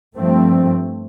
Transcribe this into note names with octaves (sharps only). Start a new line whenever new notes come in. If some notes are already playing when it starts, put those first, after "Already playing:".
G2 F3 A3 C4